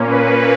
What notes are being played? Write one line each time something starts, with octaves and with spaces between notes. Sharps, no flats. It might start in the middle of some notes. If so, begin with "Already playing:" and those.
Already playing: A#2 A#3 C#4
B4